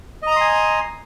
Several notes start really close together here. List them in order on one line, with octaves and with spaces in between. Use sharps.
D#5 A#5 D#6 C6 G#5